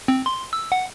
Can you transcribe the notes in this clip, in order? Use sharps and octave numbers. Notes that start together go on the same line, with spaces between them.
C4
C6
E6
F#5